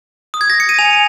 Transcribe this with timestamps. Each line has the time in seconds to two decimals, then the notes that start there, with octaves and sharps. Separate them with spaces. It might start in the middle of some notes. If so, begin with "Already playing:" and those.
0.34 D#6
0.41 G#6
0.50 A#6
0.60 C#7
0.69 D#7
0.79 G#5 F7